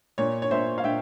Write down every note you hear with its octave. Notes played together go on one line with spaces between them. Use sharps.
A#2 C#5
C#5
A#2 C5 E5
F5
A#2 E5 G5